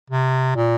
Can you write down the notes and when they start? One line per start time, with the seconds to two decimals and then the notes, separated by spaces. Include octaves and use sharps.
0.10 C3
0.56 A#2